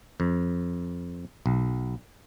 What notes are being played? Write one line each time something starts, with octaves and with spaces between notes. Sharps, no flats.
F2
B1